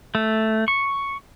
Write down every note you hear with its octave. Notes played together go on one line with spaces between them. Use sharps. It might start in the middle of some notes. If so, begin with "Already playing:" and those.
A3
C#6